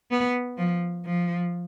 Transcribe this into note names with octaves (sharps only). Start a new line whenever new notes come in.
B3
F3
F3